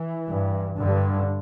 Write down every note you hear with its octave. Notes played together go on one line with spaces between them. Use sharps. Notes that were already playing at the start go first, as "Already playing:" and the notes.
Already playing: E3
G2
G2 D3